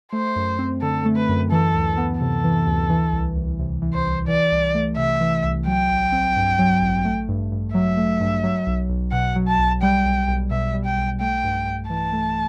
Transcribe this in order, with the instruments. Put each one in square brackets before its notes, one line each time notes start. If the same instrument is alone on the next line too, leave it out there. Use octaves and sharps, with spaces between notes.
[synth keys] A3 [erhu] C5
[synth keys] F#2
C4
[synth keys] D3 [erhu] A4
[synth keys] A3
[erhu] B4
[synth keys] F#2
[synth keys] E3 [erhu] A4
[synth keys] D2
B3
[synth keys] C3 [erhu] A4
[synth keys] E3
D2
E3
C2
C2
C3
E3
[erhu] C5
[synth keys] C2
[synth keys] E3 [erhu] D5
[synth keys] C2
A3
[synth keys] C3 [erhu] E5
[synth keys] E3
C2
[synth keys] F#3 [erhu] G5
[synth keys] A1
C4
G2
F#3
A1
A3
G2
G2
[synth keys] F#3 [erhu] E5
[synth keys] A3
G2
F#3
B1
B1
[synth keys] B2 [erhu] F#5
[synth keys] F#3
[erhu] A5
[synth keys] B1
[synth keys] G3 [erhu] G5
[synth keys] B1
B1
[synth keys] B2 [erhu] E5
[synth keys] G3
[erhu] G5
[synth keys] B1
[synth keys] A3 [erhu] G5
[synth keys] G2
G2
[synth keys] E3 [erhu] A5
[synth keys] A3